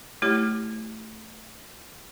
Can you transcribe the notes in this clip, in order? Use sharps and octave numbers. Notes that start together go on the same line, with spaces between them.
A3 E4 G4 C#5